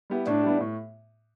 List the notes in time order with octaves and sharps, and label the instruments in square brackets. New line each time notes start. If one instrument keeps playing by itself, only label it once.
[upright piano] G3 B3 E4 G4
[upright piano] A2 [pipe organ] D4
[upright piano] G3 B3 E4 G4
A2